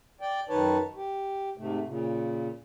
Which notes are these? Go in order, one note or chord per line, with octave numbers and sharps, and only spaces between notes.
D5 G5
F#2 D#3 D#4 B4 C#5 A5
G4
G#2 C3 A3
A#2 C#3